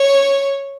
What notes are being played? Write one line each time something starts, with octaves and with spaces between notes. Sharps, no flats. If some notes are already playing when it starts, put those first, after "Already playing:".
Already playing: C#5